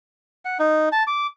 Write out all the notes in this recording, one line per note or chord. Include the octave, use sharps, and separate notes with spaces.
F#5
D#4
A5
D6